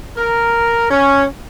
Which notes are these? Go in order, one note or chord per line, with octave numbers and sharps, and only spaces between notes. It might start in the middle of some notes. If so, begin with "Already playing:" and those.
A#4
C#4